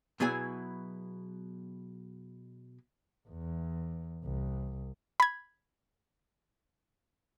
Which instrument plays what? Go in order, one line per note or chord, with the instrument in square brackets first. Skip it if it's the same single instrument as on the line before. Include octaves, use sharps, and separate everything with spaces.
[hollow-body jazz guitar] B2 F#3 B3 E4 G#4 G#5
[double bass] E2
C2
[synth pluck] B5 G#6